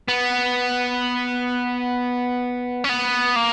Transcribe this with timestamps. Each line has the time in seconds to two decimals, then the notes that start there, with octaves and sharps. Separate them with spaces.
0.08 B3
2.84 C#4
2.89 B3
3.36 A#3